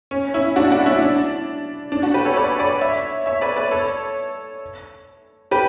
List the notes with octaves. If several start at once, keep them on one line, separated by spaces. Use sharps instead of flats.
C#4
C#4 E4
D4 F#4
D4 F#4
C#4 E4
D4
D4
D4 F#4
G4 B4
A4 C#5
B4 D5
B4 D5
C#5 E5
C#5 E5
B4 D5
B4 D5
A4 C#5
G4 B4